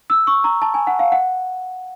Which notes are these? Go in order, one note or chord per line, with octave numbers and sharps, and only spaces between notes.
E6
C#6
A#5
A5
G#5
F#5
F5
F#5